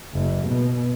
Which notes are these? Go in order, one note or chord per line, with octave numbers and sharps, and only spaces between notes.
F#1
B2